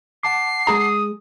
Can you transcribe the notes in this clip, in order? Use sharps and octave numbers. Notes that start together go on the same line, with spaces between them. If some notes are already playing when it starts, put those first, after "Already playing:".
F#5 A5 D6 C7
G#3 G#4 A#5 D#6